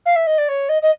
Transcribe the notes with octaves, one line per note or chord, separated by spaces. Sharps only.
F5
E5
D#5
D5
C#5
D#5
D#5